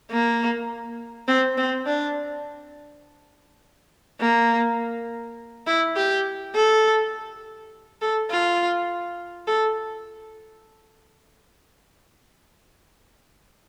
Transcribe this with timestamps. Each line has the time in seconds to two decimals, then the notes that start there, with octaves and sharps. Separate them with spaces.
0.11 A#3
1.28 C4
1.57 C4
1.86 D4
4.20 A#3
5.67 E4
5.96 G4
6.55 A4
8.02 A4
8.31 F4
9.47 A4